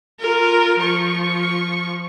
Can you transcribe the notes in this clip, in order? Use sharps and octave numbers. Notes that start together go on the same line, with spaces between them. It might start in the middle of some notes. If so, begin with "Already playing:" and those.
F4 A#4
F3 C#6